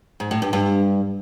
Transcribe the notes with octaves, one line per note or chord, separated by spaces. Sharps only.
G#2
A2
G2
G2